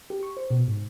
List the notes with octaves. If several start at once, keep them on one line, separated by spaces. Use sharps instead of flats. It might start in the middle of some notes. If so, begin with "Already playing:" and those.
G4
C#6
C5
B2
G#2